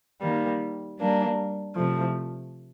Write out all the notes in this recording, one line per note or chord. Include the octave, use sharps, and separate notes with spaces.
D#3 G3 A#3
G3 A#3 D4
C3 F3 A3